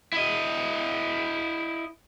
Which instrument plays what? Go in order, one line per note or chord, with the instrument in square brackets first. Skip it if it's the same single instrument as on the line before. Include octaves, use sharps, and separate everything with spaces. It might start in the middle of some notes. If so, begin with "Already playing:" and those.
[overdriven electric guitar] E4 D#5